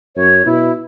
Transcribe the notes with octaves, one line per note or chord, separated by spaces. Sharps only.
F#2 C#5
B2 E4